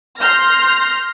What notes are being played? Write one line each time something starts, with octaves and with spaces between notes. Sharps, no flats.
C6 F6 G6 A#6